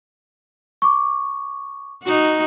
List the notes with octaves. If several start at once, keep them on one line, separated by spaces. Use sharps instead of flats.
C#6 D6
D#4 F#4